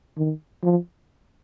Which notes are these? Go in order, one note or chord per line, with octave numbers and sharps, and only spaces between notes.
D#3
F3